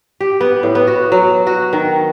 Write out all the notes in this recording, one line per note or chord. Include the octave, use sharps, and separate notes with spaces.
G4
B3
A2
B3
F#4
F#3
F#4
D#3